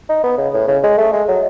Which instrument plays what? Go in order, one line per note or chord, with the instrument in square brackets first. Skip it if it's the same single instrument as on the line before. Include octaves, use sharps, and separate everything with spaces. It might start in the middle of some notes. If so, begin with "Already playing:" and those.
[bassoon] D#4
B3
C#3
A2
C#3
G#3
A3
G#3
F#3